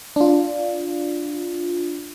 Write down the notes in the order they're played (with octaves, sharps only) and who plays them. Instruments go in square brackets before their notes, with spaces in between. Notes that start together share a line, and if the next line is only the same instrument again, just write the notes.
[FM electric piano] D4 F4